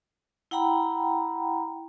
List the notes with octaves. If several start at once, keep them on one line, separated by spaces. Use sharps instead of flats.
E4 F#5 G5 A#5 B5